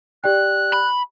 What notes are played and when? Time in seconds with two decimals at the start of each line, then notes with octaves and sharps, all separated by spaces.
0.24 G4 D5 G5 F#6
0.73 B5